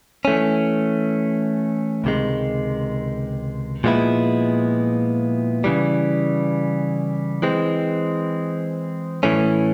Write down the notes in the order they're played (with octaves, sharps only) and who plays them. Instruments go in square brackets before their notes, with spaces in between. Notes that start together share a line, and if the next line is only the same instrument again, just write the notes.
[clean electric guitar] E3 A3 C#4
C#2 C3 D#3 G#3
A#2 F3 G#3 B3 E4
C#3 E3 G3
E3 G#3 C4
A2 E3 A3 C#4